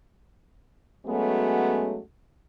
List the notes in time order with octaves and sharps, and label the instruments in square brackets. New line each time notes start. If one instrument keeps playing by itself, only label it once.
[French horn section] F#3 G#3 A3 B3 C#4 F#4